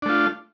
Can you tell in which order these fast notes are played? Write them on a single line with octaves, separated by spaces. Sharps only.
D4 A3 F4